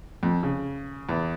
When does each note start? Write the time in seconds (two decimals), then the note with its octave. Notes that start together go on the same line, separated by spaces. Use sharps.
0.23 F2
0.43 C#3
1.09 E2